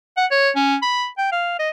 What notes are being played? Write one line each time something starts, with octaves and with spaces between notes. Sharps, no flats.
F#5
C#5
C#4
B5
G5
F5
D#5